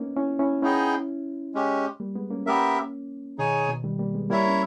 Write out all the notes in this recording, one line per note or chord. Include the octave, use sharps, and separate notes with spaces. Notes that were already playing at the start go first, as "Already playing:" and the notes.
Already playing: A#3 B3 C#4 D#4
C#4 E4
C#4 E4
B3 C#4 D#4 E4 G#4 D#5 G5
G#3 C#4 G4
G3 A#3
G#3 B3
A#3 C#4
A#3 B3 C#4 G4 A#4 E5
B2 D#3 D#4 G#4 C#5 G#5
B2
D#3 G3
G3 A#3
G#3 B3
G3 A#3 E4 A#4 C#5 E5
C#4